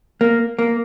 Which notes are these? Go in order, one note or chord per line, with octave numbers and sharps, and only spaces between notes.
A#3
A#3